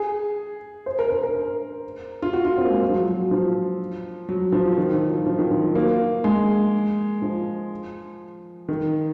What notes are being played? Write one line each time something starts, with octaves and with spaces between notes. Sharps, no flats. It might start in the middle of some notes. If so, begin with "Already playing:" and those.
Already playing: G#4
C5
A#4
A#4
A#4
F4
F#4
F4
C4
A#3
G#3
F#3
F3
F#3
F#3
F3
F#3
F3
D#3
F3
F#3
F3
D#3
F3
F#3
A#3
G#3
F3
D#3